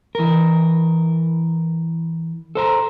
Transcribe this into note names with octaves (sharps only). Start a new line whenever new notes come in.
E3 A#4
A4 C5 A#5